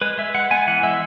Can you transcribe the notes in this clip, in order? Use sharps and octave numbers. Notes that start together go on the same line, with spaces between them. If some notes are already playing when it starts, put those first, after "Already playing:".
G#3 B4
G#3 E5
G#3 F#5
B3 G#5
E3 F#5
G#3 E5